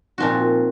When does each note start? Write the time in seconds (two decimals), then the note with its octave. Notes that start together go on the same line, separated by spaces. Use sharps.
0.18 A#2 F3 C4 D#4 F#4
0.39 F4